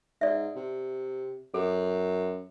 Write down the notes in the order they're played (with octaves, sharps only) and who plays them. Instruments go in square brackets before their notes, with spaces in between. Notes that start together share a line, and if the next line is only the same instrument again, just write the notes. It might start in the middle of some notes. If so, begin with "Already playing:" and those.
[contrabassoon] G#2 [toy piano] D5 E5
[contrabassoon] C3
[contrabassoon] F#2 [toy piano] A4